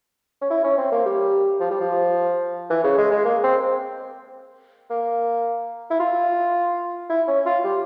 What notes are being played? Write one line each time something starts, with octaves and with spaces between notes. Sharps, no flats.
C#4
E4
C#4
C4
A#3
G3
F3
G3
F3
E3
C#3
G#3
G#3
A#3
C4
A#3
E4
F4
E4
C#4
F4
G3